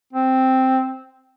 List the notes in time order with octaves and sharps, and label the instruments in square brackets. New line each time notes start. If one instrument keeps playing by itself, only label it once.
[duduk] C4